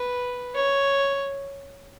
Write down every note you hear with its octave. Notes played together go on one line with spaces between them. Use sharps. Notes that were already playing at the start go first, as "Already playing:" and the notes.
Already playing: B4
C#5